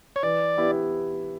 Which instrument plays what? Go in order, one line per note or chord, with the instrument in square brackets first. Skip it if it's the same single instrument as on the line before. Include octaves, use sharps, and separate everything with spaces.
[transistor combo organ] C#5
[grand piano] E3 [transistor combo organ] D5
[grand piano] B3 E4 G4